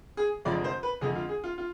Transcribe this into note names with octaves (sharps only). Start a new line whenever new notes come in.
G#4
F1 F2 D3 F3 G#3 D5
C5
B4
F2 D3 G#3 G#4
F4
G#4
F4
F4